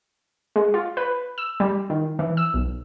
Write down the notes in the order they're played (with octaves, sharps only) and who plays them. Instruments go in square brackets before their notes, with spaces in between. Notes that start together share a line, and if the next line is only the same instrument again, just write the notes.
[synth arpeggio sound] G#3
F4
B4
E6
G3
D#3
E3
E6
B1